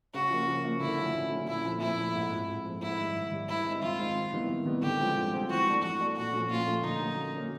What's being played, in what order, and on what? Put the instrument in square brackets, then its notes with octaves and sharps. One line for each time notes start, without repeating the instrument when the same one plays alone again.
[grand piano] C#3 [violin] F#4
[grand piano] F3 A#3
C#3
F3 A#3
[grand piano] D3 [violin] E4
[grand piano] F#3 A3 C#4 F4
D3
F#3 A3 C#4 F4
[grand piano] A#2 [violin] E4
[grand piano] F3 A3 C4
[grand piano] A#2 [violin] E4
[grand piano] F3 A3 C4
G#2
F3 A3 C4
G#2
F3 A3 C4
[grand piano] G#2 [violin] E4
[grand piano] D#3 G3
G#2
D#3 G3
[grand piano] D#3 [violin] E4
[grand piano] G#3 C4 D#4
[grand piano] D#3 [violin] F4
[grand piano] G#3 C4 D#4
C3
D#3 G3 B3 E4
C3
D#3 G3 B3 E4
[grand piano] D3 [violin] G4
[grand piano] F3 G#3 C4 F4
D3
F3 G#3 C4 F4
[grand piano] E3 [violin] F#4
[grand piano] A3 D4
[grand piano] E3 [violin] F#4
[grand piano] A3 D4
[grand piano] A#2 [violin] F#4
[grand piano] F3 A3 C#4
[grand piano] A#2 [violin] F4
[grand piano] F3 A3 C#4
[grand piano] D3 [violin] D#4
[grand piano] F#3 A#3 C#4
D3
F#3 A#3 C#4